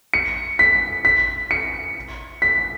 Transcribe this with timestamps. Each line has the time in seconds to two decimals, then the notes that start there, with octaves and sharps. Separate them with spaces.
0.14 C#7
0.59 B6
1.05 B6
1.51 C#7
2.42 B6